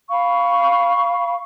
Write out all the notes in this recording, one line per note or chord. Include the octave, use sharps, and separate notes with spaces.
F5 B5 C#6